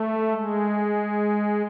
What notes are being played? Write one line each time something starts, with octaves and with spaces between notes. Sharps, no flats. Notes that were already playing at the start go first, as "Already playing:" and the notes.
Already playing: A3
G#3